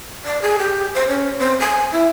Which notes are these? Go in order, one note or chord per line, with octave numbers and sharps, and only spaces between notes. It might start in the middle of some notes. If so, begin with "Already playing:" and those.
D5
G#4
G4
C5
C#4
C4
G#5
E4